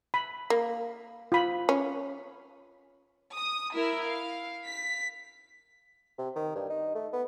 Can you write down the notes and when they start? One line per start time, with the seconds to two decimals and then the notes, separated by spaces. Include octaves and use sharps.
0.14 B5
0.50 A#3
1.32 F4 B5
1.69 C#4
3.34 D#6
3.74 E4 A#4 E5
4.06 F5
4.65 B6
6.18 C3
6.36 D#3
6.55 G2
6.69 D#4
6.95 A3
7.13 B3